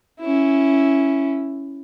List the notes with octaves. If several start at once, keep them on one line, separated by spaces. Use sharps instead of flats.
C#4 E4